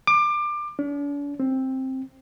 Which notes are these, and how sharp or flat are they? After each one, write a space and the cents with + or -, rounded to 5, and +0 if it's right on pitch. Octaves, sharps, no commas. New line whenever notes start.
D6 +25
D4 -45
C4 +10